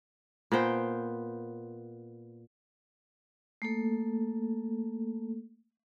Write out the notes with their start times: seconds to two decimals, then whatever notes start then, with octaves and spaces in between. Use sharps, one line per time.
0.52 A#2 B3 C5 G5
3.62 A3 A#3 A4